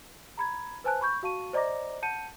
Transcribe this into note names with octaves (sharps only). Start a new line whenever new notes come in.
A#5 B5 G#6
B4 C5 G#5 A5 F#6
B5 C#6 G6
F#4 F5 A5 C#6 D#7
C5 D5 D#5 A#5 D6 A#6
F#5 A5 G6 C#7 D#7